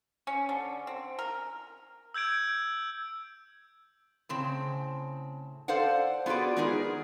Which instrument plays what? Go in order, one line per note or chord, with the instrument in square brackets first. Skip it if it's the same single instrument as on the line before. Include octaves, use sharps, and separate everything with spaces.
[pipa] C#4
D3
C4
A#4
[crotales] E6 G6 G#6 D7
[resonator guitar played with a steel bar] A2 C#3 C4
A4 C5 D5 F5 F#5
B3 F4 F#4 G#4 D5
G#3 B3 D#4 G#4 A#4